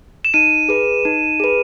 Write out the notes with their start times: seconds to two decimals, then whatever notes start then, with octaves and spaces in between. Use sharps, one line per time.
0.25 E7
0.34 D#4 D#7
0.69 G#4 B4
1.05 D#4
1.40 G#4 B4